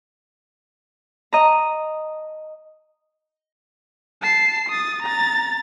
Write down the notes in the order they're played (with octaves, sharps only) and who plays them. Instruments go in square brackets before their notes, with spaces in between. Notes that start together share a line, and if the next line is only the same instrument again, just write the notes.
[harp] D#5 A#5
[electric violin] A5 C7
D#6 A6
A#5 A6